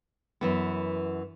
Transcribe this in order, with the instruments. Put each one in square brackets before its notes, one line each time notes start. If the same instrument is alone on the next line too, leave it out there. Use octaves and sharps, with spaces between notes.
[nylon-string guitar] F#2 E3 B3